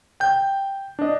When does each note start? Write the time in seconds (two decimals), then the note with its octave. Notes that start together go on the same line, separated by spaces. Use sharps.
0.20 G5 G6
0.99 D4 D#5